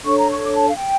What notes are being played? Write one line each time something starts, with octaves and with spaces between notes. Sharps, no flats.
D4 A4 C#5 C#6
A#5
C#6
D6
A5
F5
G5